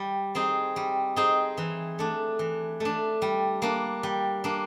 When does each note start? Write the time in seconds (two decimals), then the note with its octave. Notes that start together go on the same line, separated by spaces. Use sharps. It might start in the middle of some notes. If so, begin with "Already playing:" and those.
Already playing: G3
0.35 C4 D#4 G#4
0.76 G3
1.16 C4 D#4 G#4
1.58 E3
1.99 A3 D4
2.39 E3
2.80 A3 D4
3.22 G3
3.62 A#3 D4
4.03 G3
4.44 A#3 D4